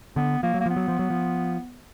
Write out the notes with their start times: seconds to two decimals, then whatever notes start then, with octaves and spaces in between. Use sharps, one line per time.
0.16 D3 B3
0.43 F3 A#3
0.54 F#3
0.61 A#3
0.66 F3 B3
0.77 F#3
0.88 F3
0.99 F#3
1.10 F3